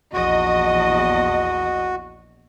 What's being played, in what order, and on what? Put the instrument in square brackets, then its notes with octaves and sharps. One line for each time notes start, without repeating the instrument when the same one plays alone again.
[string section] A#1 E2 D#5 [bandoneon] F#4